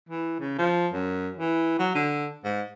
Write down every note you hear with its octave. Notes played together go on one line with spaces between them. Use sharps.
E3
C#3
F3
F#2
E3
F#3
D3
G#2